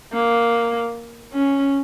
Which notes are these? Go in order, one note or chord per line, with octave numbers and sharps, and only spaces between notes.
A#3
C#4